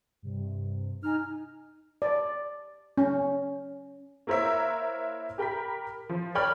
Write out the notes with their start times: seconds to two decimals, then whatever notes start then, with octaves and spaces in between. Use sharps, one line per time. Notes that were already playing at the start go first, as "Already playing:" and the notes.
0.22 G2 C3
1.03 D#4 G#5 A#5 F6
2.02 D5
2.98 C#4
4.27 A#3 E4 A#4 C5 C#5 E5
5.38 G4 A#4 G5 B5 B6
6.09 F3
6.35 A#4 C#5 D5 G5 B5 F6